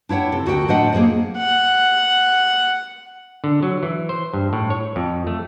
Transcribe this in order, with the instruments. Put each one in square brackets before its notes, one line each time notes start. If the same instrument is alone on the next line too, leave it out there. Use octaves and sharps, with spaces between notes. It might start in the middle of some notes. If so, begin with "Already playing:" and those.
[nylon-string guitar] D4 E4 C#5 F#5 G5
C3 A4
D2 F#4 A4 A#4 D#5 G5
A2 D4 C5 D#5 F#5 G5
A#3 G#4 A4 C5 D#5
[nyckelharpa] F#5
[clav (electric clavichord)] D3
F#3
E3
C5
G2
A2
C#5
F2
A3